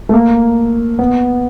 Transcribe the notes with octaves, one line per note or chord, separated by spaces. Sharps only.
A3
A#3
B3